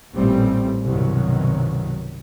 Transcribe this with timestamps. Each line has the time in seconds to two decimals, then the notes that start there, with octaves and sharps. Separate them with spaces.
0.15 A1 A#2 G3 A3 C4
0.84 C2 G2 B2 D#3 F#3